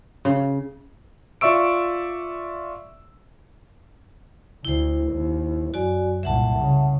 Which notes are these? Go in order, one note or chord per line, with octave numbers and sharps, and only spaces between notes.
C#3
F4 D5 E5 C#6 E6 D7
D2 E4 C5
D#2
F#2 F#4 D5 G#5
C2 A#2 E5 F#5 A5
C#3